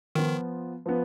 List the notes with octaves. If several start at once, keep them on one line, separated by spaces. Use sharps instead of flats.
D#3 F3 B3 F4
F3 B3